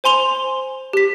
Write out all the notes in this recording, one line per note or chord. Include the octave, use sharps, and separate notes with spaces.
C5 G#5 C6 F7 G7
G4 B6